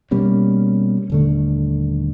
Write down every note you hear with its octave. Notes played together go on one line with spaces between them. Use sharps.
B2 G3 A#3 C#4
D#1 D3 A3